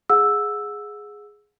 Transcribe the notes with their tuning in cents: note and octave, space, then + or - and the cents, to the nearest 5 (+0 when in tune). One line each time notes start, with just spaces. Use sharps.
G#4 +0 F#5 -35 E6 +0